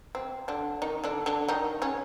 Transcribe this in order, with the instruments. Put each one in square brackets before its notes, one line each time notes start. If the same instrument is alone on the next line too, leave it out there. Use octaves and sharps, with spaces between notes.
[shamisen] C4
D3 D4
D#3 D#4
D3 D4
D3 D4
D#3 D#4
C#3 C#4